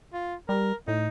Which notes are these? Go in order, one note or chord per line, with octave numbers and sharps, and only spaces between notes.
F4
G3 A#4
A2 D#4